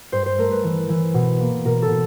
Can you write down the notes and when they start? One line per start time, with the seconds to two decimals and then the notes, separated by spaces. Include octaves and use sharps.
0.12 G2 C5
0.26 C5
0.38 A3 A#4
0.52 B4
0.64 E3
0.89 E3
1.14 B2
1.40 A#3
1.65 B2 A#4
1.82 A4
1.91 B2